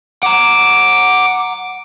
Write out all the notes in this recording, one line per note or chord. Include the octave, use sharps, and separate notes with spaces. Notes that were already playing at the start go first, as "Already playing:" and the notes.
F#5 A#5 D6